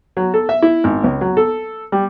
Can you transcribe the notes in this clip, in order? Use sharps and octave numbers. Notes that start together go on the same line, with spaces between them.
F#3
A4
E5
E4
G#1
C#2
F#3
A4
G3